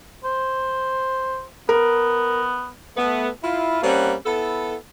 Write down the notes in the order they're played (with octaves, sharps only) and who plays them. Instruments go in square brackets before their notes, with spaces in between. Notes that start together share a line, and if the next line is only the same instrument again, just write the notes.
[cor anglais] C5
[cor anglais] B3 [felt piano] A#4
[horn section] A3 B3
E4 F4
G3 A#3 C4 C#4 F#5
B3 E4 A4